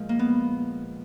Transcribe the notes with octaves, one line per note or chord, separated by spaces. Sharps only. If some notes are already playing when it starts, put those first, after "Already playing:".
Already playing: A#2 F3 G#3
A#3
B3